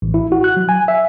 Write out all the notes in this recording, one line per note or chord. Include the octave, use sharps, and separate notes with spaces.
A1
E4
F#4
F#6
F#3
G#5
E5